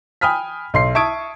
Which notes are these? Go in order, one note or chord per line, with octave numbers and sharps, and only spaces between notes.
G5 G#5 B5 D#6 F6 B6
B1 C6 C7
E5 A5 C#6 D#6 G#6 D7